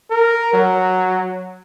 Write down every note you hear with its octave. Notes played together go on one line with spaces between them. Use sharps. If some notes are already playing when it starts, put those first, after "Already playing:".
A#4
F#3